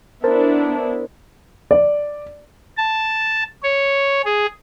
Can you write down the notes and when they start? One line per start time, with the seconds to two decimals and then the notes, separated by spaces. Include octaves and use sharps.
0.24 B3 D4 E4 A#4 C5 A5
1.71 D5
2.77 A5
3.63 C#5
4.25 G#4